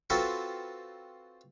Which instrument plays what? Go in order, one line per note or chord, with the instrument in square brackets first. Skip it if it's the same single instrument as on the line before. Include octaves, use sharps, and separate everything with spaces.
[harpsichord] C4 F4 F#4 A4 B4 C5